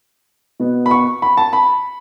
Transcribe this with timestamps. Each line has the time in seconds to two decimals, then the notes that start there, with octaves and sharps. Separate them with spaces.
0.60 B2 B3
0.86 B5
0.91 C#6
1.22 B5
1.37 A5
1.53 B5